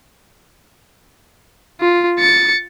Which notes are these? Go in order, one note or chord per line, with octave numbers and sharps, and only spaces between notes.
F4
A6 C#7